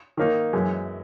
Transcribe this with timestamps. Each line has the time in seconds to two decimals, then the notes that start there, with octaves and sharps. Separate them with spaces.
0.17 D#3 A#3 D#4
0.53 F#2 E3 G#3